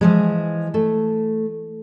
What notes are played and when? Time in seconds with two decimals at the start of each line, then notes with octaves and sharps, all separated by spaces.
0.01 E3 F3 G#3
0.74 A3